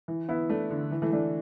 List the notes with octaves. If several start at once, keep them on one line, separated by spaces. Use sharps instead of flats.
E3
B3 E4
A3 D4
D3
E3
E3 A3
A3 D4